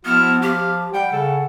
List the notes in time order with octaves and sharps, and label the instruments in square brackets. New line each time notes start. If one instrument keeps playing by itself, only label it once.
[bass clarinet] F3 [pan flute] B3 [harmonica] E4 F#4 F6
[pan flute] G4 [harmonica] F5
[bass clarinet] G3 [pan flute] F#5 [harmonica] G5
[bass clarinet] C#3 [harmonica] A4